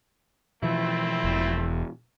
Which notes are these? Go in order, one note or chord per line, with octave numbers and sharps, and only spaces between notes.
B2 E3 F3 A3 C4 E4
E1